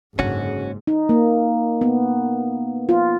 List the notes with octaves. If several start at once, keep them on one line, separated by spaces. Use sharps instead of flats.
F#1 G#2 D3 C#4 F#4
D#4
A#3
B3
F4